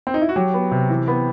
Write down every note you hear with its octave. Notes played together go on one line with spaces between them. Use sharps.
C4
D#4
E4
F#4
F#3 G4
B3
C3
E3
B3